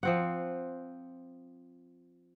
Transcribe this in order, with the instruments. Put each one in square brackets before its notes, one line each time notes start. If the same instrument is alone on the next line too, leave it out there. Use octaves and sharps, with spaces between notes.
[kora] F3 C4 F#5